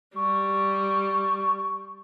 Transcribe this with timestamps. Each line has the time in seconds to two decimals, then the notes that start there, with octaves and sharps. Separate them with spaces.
0.16 G3 C#6